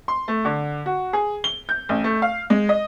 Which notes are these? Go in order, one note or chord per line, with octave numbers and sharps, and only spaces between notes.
C6
A3
D3
F#4
G#4
G7
G6
A1
A3
F5
G#3
D#5